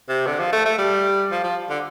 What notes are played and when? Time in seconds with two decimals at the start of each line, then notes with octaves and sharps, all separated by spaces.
0.09 C3
0.26 D3
0.40 F3
0.52 A3
0.66 A3
0.78 G3
1.31 F3
1.44 F3
1.70 D3